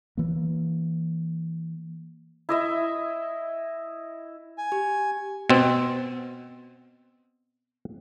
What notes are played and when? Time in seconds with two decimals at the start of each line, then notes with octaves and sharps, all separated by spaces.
0.17 E3 A#3
2.49 E4 D#5 E5
4.58 G#5
4.72 G4
5.50 B2 C4